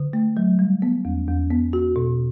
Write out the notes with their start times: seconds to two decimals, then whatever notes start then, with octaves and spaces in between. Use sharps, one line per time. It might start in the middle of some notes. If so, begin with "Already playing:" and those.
Already playing: D3
0.13 A3
0.37 F#3
0.59 G3
0.82 B3
1.05 E2
1.27 E2
1.51 B3
1.73 F#4
1.96 B2